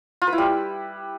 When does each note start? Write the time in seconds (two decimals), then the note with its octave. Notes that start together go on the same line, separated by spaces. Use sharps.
0.22 F4
0.27 B4
0.33 E4
0.38 G3